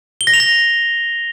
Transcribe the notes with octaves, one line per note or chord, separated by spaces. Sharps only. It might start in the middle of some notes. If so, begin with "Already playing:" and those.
G7
A#6
F7
A#6